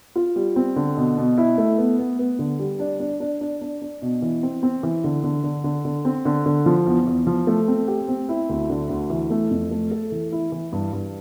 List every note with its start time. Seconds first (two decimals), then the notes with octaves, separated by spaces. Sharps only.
0.15 F4
0.36 G3
0.56 C4
0.76 D3
0.97 B2
1.17 B2
1.38 E4
1.58 A3
1.78 B3
1.99 B3
2.19 B3
2.39 D3
2.59 G3
2.80 D4
3.00 D4
3.20 D4
3.41 D4
3.61 D4
3.82 D4
4.02 B2
4.22 E3
4.43 C4
4.63 C4
4.83 E3
5.04 D3
5.24 D3
5.44 D3
5.64 D3
5.85 D3
6.05 C4
6.25 D3
6.46 D3
6.66 F3
6.86 E2
7.07 E2
7.27 F3
7.47 A3
7.68 C4
7.88 G4
8.08 C4
8.29 E4
8.49 D2
8.70 D3
8.89 D2
9.10 E3
9.30 A3
9.51 F2
9.71 A3
9.91 A4
10.12 E3
10.32 E4
10.52 E3
10.73 G2
10.93 G2